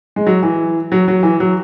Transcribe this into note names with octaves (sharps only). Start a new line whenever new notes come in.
G#3
F#3
E3
F#3
F#3
E3
F#3